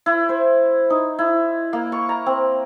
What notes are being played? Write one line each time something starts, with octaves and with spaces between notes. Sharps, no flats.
E4
C5
D#4
E4
A#3
C#6
A#5
C4